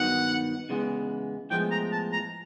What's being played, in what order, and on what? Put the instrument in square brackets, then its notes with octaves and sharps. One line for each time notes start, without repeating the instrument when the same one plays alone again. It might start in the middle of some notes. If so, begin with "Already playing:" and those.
Already playing: [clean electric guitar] G2 D#3 F#3 B3 D#4 [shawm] F#5
[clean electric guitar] E2 C#3 E3 G#3 B3
[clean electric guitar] A2 F3 G#3 B3 [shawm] G5
[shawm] A#5
A5
A#5